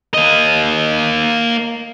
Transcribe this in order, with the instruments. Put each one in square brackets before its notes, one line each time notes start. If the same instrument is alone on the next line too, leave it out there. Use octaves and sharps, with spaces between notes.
[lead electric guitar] A#3 D#5